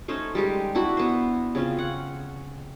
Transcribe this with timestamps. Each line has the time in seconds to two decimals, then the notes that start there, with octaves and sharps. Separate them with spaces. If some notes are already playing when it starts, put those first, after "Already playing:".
0.08 A3 C#4 D#4 C5
0.35 G3 G#3 G4
0.75 D4 E4 F#4 B5
0.97 B3 C5
1.55 C#3 C4 C#4 F4
1.79 F#5